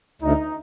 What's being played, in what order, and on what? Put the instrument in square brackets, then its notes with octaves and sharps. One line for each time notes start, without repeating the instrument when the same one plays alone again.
[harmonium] D2 [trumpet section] D#4